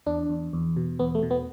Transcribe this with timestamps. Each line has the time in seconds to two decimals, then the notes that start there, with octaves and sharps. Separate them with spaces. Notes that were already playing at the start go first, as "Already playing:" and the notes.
0.06 E2 D4
0.30 E2
0.53 E2
0.76 B2
0.99 E2 B3
1.15 A3
1.23 B2
1.31 B3